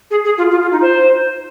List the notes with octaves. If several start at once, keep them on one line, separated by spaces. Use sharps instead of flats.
G#4
G#4
F4
F4
F4
D#4
C5